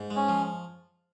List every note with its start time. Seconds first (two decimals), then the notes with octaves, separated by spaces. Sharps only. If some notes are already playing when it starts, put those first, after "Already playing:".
Already playing: G#2
0.11 G#3
0.16 C#4
0.29 F3